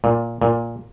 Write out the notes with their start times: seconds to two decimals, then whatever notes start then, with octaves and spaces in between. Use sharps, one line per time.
0.04 A#2
0.42 A#2